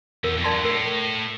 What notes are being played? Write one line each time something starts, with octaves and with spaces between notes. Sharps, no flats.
E2 A#4
F2
D5 A5 C6
G2
A2 A#4